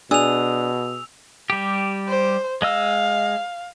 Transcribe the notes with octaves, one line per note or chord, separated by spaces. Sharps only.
B2 D4 G#4 E6 F7
G3 G4
C5
G#3 D#5 F5 E6